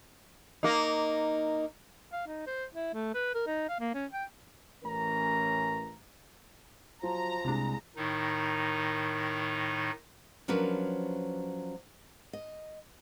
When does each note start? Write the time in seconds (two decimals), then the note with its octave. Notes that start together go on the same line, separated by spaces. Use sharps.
0.63 A#3 D#4
2.13 F5
2.27 D#4
2.47 C5
2.74 E4
2.94 A3
3.15 B4
3.35 A#4
3.47 D#4
3.69 F5
3.80 A#3
3.95 C#4
4.13 G5
4.85 A1 A2 E3 C#4 A#4 A#5
7.03 F3 F#3 A#5
7.45 C2 C3 G#3 D4
7.97 A2 D#3 D#4
10.48 F3 F#3 C#4 D4 A#4 B4
12.33 D#5